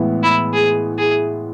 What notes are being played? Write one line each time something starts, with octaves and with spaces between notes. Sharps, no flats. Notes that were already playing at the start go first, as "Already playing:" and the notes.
Already playing: A2 E3 G#3 B3
E4
G#4
G#4